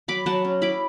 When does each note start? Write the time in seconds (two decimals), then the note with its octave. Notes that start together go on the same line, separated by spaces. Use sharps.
0.08 F#3 B5 D6
0.26 F#3 F#5 A5
0.45 C#4
0.62 E4 B5 D6